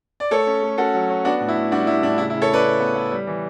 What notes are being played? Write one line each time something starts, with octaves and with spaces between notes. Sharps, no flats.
D5
A3 A4 C#5
C#4
A3
C#4 F#4 A4
F#3
C#4
B3 D4 F#4
A2
E4
A2
G3 D4 F#4
G3 E4
A2 D4
C#3 E4
E4
C#3
A4 C#5
C#3 B4 D5
C#3
B3
B3
G3
E3